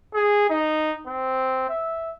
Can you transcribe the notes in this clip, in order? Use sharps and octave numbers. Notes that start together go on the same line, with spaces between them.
G#4
D#4
C4
E5